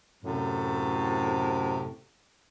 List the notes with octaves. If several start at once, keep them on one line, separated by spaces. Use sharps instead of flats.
F#2 A2 C3